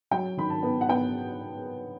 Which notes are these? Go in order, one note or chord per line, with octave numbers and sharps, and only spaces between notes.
F#3 G5
D#3 B5
A5
B3
F#5
B3 G5